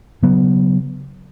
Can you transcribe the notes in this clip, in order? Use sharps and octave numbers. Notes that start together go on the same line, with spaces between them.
C#3 F#3 B3